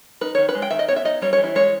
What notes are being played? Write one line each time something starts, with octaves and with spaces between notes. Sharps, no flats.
D#4 B4
D#3 C#5
B4
G#3
G5
D#3 E5
D#5
B3 C#5
E5
D#4 D#5
G3 C#5
C#5
E3
E4
G#3 C#5